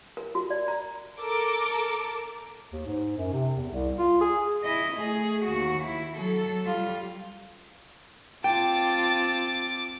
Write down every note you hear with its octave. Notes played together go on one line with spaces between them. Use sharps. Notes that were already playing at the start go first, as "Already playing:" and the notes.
A#4
F#4
D5
A#5
A4 A#4 D6
D#2
G#2
F#2
C3
E2
C2
F4
G#4
E4 D#5
A3 G#4
D#2 F#4
E4
F#3 A4
G3 F4
C4 F4 G5 A5 D6